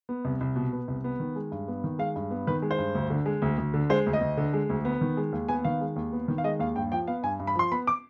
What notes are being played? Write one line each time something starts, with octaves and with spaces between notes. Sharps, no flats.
B3
C2
C2
B2
B3
C2
B3
D#3
G#3
G2
B3
D#3
G#3 F5
G2
B3
D#3 B4
G#3
C5
G2
D2
D3
G#3
D2
D2
D3
G#3 C5
D2
D#5
D2
D3
G#3
D2
B3
D#3
G#3
D#2
B3 G#5
D#3 F5
G#3
D#2
B3
D#3
F5
G#3 D#5
D#2 F5
G2 G5
F3 G5
B3 F5
G2 G#5
G2
B5
F3 C6
B3 B5
D6